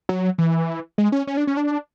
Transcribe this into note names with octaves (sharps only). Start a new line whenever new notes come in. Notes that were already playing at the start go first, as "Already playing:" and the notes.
F#3
E3
G#3
C#4
C#4
D4
C#4
D4